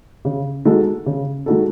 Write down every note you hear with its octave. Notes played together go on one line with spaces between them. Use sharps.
C#3
G#3 D#4 F#4 A4
C#3
G#3 D#4 F#4 A4